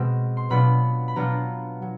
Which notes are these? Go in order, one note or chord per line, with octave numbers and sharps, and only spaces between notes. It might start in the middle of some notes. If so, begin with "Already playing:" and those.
Already playing: B2 G#3 C4
C6
B2 F#3 B3 D4 F4 B5
B5
B2 F#3 B3 D4 F4 A#5
F#3